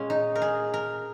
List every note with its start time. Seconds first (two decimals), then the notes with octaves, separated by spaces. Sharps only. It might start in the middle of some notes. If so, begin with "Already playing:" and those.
Already playing: A#2 G#3 C#4
0.10 D#4
0.36 A#4
0.42 G#4
0.74 A#4